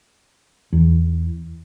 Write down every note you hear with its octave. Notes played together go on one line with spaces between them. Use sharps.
E2